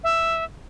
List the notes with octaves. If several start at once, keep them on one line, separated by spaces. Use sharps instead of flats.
E5